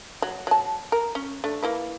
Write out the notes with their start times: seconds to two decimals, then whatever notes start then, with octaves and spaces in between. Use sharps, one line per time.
0.22 F#3
0.47 F#3 A5
0.92 A#4
1.15 C#4
1.44 A3 D4
1.63 A#3 E4 B4